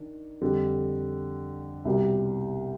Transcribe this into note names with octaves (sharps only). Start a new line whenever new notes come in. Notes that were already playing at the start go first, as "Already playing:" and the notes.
Already playing: D#3 D4
F2 D3 G3
C2 B2 G3